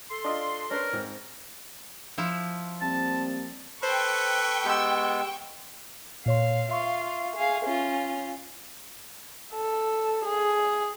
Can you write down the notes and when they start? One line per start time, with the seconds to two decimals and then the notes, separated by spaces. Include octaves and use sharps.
0.09 A4 C6
0.24 D4 F4 D#5
0.71 C#4 D4 A#4 B4
0.93 G#2 C4
2.18 F3 E4
2.81 G3 A#3 C4 A5
3.83 A4 B4 C5 G5 C#6
4.65 G#3 B3 G4 E6
6.26 A#2 C#5 F5 C6
6.69 F4 E5 F5 C6 C#6
7.36 G#4 F5
7.65 C#4 F4
9.54 A4
10.25 G#4